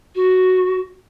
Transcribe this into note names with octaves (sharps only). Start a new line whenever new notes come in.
F#4